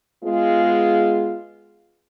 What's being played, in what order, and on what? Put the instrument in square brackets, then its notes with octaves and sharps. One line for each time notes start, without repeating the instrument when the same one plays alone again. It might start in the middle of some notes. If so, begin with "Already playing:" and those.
[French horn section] G#3 B3 F4